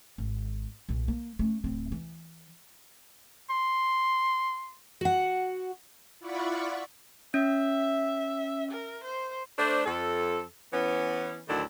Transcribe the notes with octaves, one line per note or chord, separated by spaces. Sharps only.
G#1
B1 A#2
A#3
A3 C#4
D1 C4
E3
C6
F#4 F#5
E4 F4 D5 F#5 B5 C#6
C#4 E5
A#4
C5
A3 D4 C5
F2 A4
E3 B3 C#4
D2 A2 D#3 F#3 D4 E4